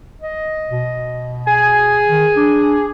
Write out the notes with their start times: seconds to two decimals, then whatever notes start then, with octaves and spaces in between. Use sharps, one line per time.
0.21 D#5
0.69 B2
1.47 G#4 G#5
2.08 D#3
2.36 D4